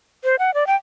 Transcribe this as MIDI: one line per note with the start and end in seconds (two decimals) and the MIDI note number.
0.24 0.36 72
0.39 0.54 78
0.54 0.66 74
0.67 0.76 79